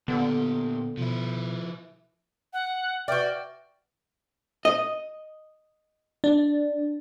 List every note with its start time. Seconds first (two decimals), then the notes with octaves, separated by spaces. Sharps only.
0.08 A#2 D3 B3 G4
0.98 B2 F3 E4
2.53 F#5
3.08 F#4 B4 D5 E5 G5 F6
4.65 D#5
6.24 D4